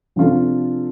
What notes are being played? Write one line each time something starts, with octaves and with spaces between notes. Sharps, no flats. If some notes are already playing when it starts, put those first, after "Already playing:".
C3 F3 D4 F4 A4